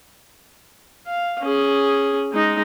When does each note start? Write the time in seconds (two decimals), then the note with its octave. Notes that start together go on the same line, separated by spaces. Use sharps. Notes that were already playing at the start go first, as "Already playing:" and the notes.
1.07 F5
1.41 C#4 G#4
2.32 G#3 D#4